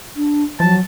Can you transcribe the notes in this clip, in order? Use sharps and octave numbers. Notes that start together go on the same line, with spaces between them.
D4
F3 F#3 A5